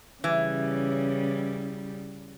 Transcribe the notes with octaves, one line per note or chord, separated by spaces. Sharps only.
C#3 E3 G3 C#4